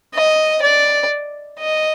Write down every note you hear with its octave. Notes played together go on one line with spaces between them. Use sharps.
D#5
D5
D#5